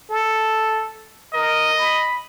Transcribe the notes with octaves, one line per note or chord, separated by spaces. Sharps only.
A4
A#4 D#5
B5